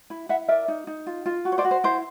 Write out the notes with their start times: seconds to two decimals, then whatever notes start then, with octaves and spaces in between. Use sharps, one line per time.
0.10 E4
0.29 E4 E5 F#5
0.48 A#4 D5 E5
0.68 D#4
0.87 D#4
1.07 F4
1.26 F4
1.45 F#4
1.52 C#5
1.58 C5 D5
1.65 F#4
1.71 C5
1.84 E4 C5